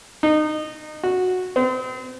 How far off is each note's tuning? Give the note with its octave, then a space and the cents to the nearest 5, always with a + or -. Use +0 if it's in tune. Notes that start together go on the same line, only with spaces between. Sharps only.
D#4 -25
F#4 -10
C4 -35